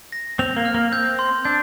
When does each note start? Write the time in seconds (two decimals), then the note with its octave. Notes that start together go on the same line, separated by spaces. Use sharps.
0.12 A#6
0.39 C4 F7
0.56 A#3
0.65 F6
0.74 A#3
0.92 C4 G6
1.19 C6
1.45 D4 G6